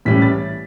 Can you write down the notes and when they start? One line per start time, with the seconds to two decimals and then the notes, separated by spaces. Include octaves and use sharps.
0.05 A2 E3 G3 C#4 B6
0.22 A6